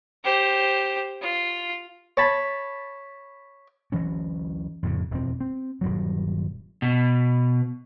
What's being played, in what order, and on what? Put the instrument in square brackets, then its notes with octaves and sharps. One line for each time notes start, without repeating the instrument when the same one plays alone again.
[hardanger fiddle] G4 C5
F4
[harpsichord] C#5 A5 B5
[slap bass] D2 E3 F#3 C#4
F2 A2 C#3
E1 F2 C3 C4
C4
D#1 G2 F#3
[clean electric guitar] B2